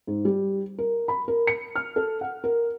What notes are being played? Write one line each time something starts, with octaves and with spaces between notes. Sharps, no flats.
G#2
G3
A#4
B5
A#4
C#7
F6
A4
F#5
A#4